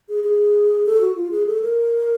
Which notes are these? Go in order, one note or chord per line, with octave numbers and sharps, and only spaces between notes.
G#4
G#4
A4
F#4
F4
G#4
A4
A#4